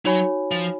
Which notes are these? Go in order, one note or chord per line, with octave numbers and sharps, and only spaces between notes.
F#3 D#4 F#4 C#5 G#5 B5
F3